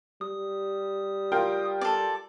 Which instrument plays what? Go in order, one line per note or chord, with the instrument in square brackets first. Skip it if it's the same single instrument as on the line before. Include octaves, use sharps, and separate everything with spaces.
[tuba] G3 [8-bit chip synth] D#6
[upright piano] F4 A#4 G5
[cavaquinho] A4 D5